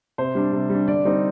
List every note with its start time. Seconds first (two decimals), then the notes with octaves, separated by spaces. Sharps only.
0.18 C3 C5
0.35 G3 D4
0.52 C3
0.70 G3
0.75 D4
0.88 D3 D5
1.05 G3 C4 D#4